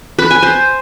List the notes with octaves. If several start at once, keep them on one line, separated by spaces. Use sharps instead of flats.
B4
G#5
C5